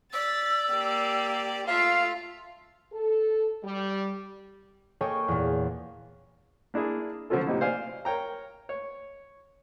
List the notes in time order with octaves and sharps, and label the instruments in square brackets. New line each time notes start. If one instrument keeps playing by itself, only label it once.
[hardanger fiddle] D5 [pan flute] E6 [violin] A6 B6
[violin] A#3 G4
[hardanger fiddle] A3 E5 [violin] F4 [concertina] F5
[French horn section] A4
G3
[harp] A#3 A4 C#5 D#5 G5 G#5
E2 A#2
[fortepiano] A#3 D4 E4 G#4
D3 F3 F#3 C#4 F4 A4
A2 C3 A#3 D#4 E4
C5 D5 F5 G#5
A#4 C#5 G5 A#5
C#5